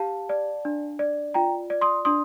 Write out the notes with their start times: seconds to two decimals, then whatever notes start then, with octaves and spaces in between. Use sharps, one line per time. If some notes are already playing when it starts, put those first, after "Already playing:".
Already playing: G4 F5 A5
0.29 D5
0.65 D4
0.99 D5
1.34 F4 G5 A#5
1.70 D5
1.81 C6 D#6
2.05 D4 C6 D#6